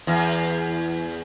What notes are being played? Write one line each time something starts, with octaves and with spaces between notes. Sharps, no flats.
E2